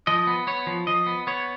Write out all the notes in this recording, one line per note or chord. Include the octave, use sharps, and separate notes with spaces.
F3 D#5
B3
B3 C#5
F3
F3 D#5
B3
B3 C#5